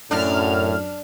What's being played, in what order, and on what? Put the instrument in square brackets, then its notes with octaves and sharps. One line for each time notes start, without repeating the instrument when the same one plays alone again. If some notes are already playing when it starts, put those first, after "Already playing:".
[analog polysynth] F#2 F6 [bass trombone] A2 [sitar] D4